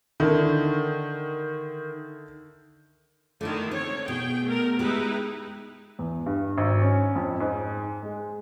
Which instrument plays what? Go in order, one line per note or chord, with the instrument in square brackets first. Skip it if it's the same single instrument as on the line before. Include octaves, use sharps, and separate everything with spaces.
[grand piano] D3 E4 [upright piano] D#3
[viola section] D3 D#3 [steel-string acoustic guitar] A3 D#4 E4
[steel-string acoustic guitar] C4 [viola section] C#5
[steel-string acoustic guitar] B2 [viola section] G#4 G5
[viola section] A3 A#4
[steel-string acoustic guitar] G#3 G4 [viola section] D#4 E4 B4
[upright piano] E2
G2
G#1
C#4
F2
G#2
G#3